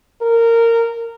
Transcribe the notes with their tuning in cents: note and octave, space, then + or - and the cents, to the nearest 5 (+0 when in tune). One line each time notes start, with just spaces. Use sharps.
A#4 -15